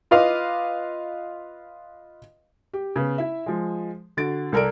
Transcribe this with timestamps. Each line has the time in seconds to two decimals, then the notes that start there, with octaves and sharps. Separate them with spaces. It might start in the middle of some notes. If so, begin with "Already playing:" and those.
0.11 F4 B4 D#5 F5 D6
2.73 G4
2.96 C#3 B3
3.18 E4 E5
3.46 F3 G#3
4.17 D3 F#4 A6 D7
4.52 C2 A4 A#4 D5 D7